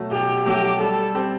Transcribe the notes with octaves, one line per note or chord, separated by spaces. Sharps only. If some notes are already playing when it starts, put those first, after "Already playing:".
Already playing: B2 F#3 A3
B2 G4
F#3 A3 G4
G3 A4
C4 G4